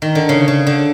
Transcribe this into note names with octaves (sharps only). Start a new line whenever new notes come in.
D#3
D3
C#3
C#3
D3